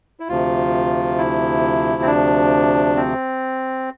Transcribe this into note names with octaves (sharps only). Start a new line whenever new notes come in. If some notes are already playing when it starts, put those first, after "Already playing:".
E4
D2 C3 F3 F4
E4
C4
D4
C4